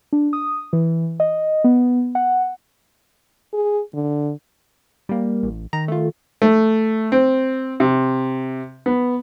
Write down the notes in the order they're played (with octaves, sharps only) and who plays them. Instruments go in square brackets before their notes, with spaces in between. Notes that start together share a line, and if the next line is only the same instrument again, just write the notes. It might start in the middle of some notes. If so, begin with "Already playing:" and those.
[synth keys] D4
D#6
E3
D#5
B3
F#5
[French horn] G#4
D3
[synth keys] G3 A#3
[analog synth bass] A1
[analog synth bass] D#3 [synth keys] A#5
[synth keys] A3 F4
[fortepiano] A3
C4
C3
B3